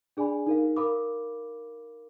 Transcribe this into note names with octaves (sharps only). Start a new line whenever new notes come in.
D4 G#4 D5 G#5 B5
D#4 A#4 F5
A#4 F5 B5 D6